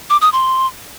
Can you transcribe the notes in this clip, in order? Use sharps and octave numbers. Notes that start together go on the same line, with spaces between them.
D6
D#6
C6